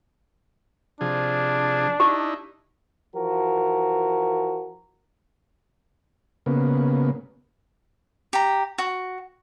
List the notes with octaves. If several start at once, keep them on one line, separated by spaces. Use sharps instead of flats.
C3 F3 D4 G#4
D#4 E4 G4
E3 F3 F#4 A#4
C#3 A#3 B3
G4 A#5
F#4